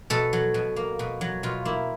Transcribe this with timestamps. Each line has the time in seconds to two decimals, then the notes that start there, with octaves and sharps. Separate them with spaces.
0.10 B2 A4
0.33 F#3
0.54 B2
0.76 A#3
0.99 B2
1.21 F#3
1.43 B2 F4
1.65 A#3 E4